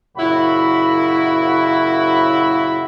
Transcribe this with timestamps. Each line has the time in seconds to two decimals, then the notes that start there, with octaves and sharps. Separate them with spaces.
0.17 F#2 A#2 C#3 E4 F#4 B5